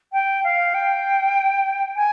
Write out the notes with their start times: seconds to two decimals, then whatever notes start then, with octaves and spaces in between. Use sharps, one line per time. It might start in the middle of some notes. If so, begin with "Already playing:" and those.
0.13 G5
0.44 F5
0.74 G5
1.96 G#5